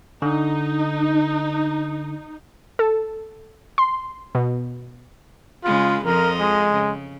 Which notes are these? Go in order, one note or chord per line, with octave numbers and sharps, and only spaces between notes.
D3 D#4
A4
C6
B2
C#3 G#3 F4 B4
F2 F3 A#4 D#5
G#3
C#3